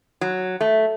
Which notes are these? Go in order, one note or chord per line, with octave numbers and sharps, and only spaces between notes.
F#3
A3